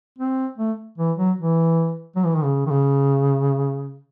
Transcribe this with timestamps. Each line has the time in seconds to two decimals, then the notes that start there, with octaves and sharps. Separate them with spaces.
0.18 C4
0.58 A3
0.98 E3
1.17 F#3
1.38 E3
2.16 F#3
2.25 E3
2.35 D#3
2.44 C#3
2.66 D#3
2.71 C#3